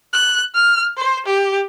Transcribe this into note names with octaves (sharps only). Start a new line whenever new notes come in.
F#6
F6
C5
G4